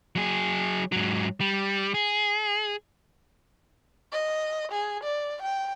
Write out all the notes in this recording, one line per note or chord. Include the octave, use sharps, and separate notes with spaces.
F#3 G#4
G#2 F#3
G3
G#4
D#5
G#4
D5
G5